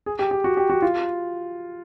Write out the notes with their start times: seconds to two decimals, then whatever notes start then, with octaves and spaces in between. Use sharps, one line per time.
0.06 G#4
0.19 G4
0.31 G4
0.44 F#4
0.57 G4
0.70 F#4
0.82 F4